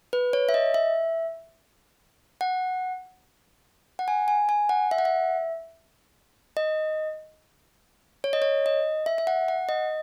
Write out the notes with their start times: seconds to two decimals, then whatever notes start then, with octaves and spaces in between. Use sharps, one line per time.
0.13 B4
0.33 C#5
0.49 E5
0.54 D#5
0.74 E5
2.41 F#5
3.99 F#5
4.08 G#5
4.28 G#5
4.49 G#5
4.69 F#5
4.91 E5
4.98 F#5
5.05 E5
6.57 D#5
8.24 C#5
8.33 D#5
8.42 C#5
8.66 D#5
9.06 E5
9.18 E5
9.27 F#5
9.48 F#5
9.69 D#5